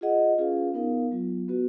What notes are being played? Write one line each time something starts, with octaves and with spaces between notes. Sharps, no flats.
F4 G#4 D#5 F#5
C#4 F4 G#4 B4 F5
B3 D#4 A#4 F5
F#3 B3 F4
B3 F#4 B4